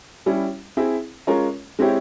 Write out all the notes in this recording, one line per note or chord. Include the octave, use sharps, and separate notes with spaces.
G3 C#4 E4
C4 E4 G#4 E5
G#3 C#4 F4 A#4 C#5
G#3 C4 E4 G4 C#5